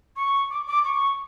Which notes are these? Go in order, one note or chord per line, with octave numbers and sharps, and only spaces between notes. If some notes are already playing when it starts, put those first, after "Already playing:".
C#6
D6
D6
C#6